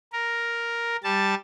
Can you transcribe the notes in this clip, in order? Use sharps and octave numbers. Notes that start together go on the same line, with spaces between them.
A#4
G3 A5